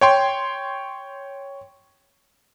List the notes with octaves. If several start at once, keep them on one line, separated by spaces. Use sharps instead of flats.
C#5 G5 C6